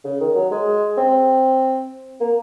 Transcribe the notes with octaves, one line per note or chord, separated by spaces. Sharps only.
C#3
D#3
F#3
G#3
C4
A#3